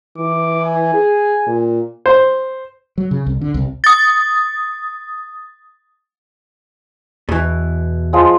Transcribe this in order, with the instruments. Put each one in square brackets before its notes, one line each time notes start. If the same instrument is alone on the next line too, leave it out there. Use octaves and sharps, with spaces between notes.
[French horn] E3 [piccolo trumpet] D6
[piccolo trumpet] G#5
[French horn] G#4
A#2
[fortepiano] C5
[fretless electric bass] F#3
C#3
C2
D3
C2
[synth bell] D#6 A6
[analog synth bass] E2 [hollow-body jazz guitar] B2 E3
[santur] F3 G#3